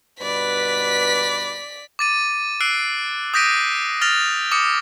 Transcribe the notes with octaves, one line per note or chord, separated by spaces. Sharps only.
G2 B2 B4 D5 B6
D6 A6 D#7
E6 F#6 C7 D7
D#6 G6 A#6 B6 D7 D#7
F6 A6 A#6 F7
D6 D#6 C#7